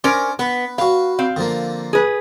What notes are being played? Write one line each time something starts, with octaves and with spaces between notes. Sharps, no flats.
C#4 A#4 C5 D5
B3 B4
F#4 B4 F5
C4 F5
D3 F3 A#3
G#4 B4